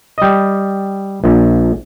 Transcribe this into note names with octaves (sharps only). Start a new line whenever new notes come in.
G3 D#5
A#1